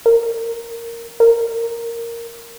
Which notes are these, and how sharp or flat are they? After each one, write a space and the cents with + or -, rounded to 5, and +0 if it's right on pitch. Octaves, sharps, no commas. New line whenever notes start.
A#4 -5
A#4 -5